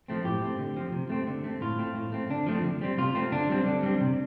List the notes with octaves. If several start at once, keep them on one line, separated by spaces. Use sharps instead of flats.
F3 A3 C4
A2 G4
A3 C4
D3
F3 C4
C3
A3 C4
D3
A3 C4
A2 F4
A3 C4
A2
A3 C4
D3 D4
F3 A3 C4
D3
G3 C4
C3 F4
A3 C4
D3 D4
G3 C4
D3
G3 C4
C3